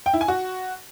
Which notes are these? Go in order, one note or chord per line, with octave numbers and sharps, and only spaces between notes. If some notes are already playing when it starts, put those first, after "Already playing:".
G5
E4
G#5
F#4